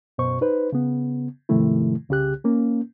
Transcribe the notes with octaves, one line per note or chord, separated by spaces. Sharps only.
F#2 B2 C5 C#6
D#4 B4 C5
C#3 B3
G#2 C3 D#3 F3 A3 E4
C2 C#3 G4 F#6
A#3 C#4